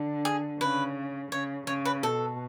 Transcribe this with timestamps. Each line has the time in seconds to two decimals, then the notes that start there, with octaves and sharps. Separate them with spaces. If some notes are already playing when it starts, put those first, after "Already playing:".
Already playing: D3
0.25 G#4
0.60 C#3 B4
1.32 C#3 C#5
1.67 C#3 C#5
1.85 B4
2.03 B2 A4